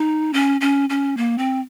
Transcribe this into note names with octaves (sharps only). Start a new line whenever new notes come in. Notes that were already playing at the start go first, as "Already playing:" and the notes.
Already playing: D#4
C#4
C#4
C#4
A#3
C4